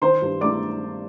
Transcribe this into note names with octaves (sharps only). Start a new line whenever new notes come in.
D#3 C5 C6
G2
A3 D5 D6